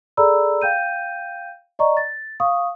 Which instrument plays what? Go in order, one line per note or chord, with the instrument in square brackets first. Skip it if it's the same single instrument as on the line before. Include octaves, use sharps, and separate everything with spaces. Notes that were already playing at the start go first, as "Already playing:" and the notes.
[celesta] G#4 A4 D5 A#5 B5 E6
F5 G5 G6 D#7
D5 D#5 A#5 C#6
A6
F5 C#6 D#6